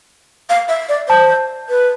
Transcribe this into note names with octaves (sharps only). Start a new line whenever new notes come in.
F5
E5
D5
C5 A5
B4